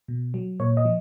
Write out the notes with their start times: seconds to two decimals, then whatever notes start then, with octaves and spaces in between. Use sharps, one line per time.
0.08 B2
0.34 F#3
0.60 A#2 C#5
0.77 D#5
0.85 F3